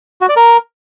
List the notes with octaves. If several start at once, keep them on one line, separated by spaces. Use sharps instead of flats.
F#4
D5
A#4